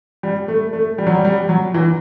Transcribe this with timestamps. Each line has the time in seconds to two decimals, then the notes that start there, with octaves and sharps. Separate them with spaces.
0.23 G3
0.48 A3
0.73 A3
0.98 G3
1.07 F#3
1.15 G3
1.25 G3
1.49 F#3
1.74 E3